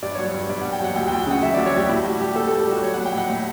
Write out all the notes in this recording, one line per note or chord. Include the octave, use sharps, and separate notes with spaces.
G2 D5
C#5
F#3
C#5
G2
G2 D5
F#5
G2
G5
F#3 F#5
D2 G5
G5
D2
G5
C#3 F#5
F#3 E5
D5
D2
C#5
F#3 G4
A2 E4
G3 F#4
G3 G4
A2 A4
A4
G3
G4
G3 F#4
F#3 C#5
F#5
F#3
G5
A2 F#5
A2